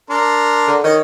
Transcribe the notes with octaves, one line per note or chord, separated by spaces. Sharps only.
D4 A#4 C6
D3
D#3 C#5 D#5